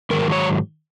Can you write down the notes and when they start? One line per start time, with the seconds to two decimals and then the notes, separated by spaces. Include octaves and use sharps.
0.10 G#2 D#3 F#3 A#4
0.32 C#5